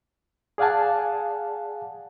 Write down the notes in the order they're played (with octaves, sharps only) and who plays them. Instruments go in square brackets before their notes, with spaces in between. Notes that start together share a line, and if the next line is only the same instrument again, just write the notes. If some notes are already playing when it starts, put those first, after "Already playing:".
[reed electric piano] G#4 D5 F5 F#5 G#5 A5